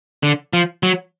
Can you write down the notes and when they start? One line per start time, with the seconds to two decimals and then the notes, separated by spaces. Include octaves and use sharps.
0.23 D3
0.53 F3
0.83 F#3